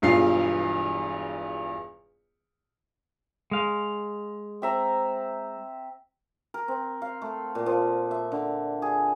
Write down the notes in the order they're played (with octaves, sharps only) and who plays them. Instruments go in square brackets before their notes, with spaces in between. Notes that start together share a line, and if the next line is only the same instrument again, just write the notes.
[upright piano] E1 E2 G2 F4 C7
[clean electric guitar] G#3 F5
[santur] C4 E5 A#5
[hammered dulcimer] A#4
C4
F5
A3
A#2
F3
E5
D3
G#4